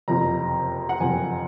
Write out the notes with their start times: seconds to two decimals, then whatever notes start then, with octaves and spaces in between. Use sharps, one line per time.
0.08 F#1 F2 C3 F3 A#5
0.89 F#5
1.00 F#1 F2 C3 F3 G#5